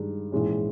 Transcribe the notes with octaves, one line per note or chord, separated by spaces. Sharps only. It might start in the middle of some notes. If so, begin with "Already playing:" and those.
Already playing: G2 D#3 G#3
A#1 G#2 E3 G#3 C#4